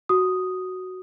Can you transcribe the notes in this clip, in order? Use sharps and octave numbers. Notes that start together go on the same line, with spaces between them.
F#4 D#6